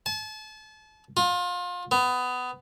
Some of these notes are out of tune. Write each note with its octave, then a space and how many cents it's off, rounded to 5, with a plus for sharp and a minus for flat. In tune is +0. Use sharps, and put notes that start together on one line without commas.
A5 -35
F4 +30
B3 +20